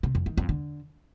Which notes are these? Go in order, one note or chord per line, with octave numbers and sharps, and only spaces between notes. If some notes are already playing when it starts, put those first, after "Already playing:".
C3
F2
D#3
F2
D3